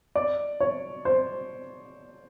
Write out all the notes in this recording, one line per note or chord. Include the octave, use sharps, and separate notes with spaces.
D5
C#5
C5